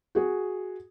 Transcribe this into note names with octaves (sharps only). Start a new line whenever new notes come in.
F#4 G#4